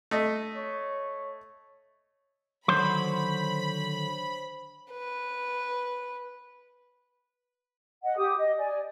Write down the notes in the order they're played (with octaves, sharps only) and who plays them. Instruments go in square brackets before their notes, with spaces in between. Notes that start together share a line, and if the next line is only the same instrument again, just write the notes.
[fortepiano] A3 D#5
[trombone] C#5
[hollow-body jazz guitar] D3 D#3 F#3 [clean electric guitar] C5 C#5 C6 [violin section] B5
[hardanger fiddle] B4
[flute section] D#5 F#5
G4 D#6
D#5
D5 G#5